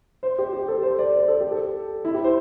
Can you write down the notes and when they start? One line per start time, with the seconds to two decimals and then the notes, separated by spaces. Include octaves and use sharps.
0.23 C5
0.38 G4
0.53 G4
0.68 A4
0.83 C5
0.99 D5
1.14 C5
1.28 A4
1.40 G4
1.52 A4
2.05 E4
2.14 G4
2.24 C5